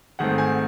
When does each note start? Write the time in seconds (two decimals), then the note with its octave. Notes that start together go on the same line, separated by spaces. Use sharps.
0.19 G#2 D#3 A3 C4 F#5
0.38 G#5